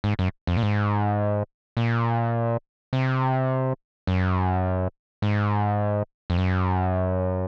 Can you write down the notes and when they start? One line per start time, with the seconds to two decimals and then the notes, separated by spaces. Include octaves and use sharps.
0.04 G#2
0.19 F#2
0.47 F2
0.57 A#2
0.63 G#2
1.77 A#2
2.93 C3
4.07 F#2
5.22 G#2
6.30 F2
6.38 F#2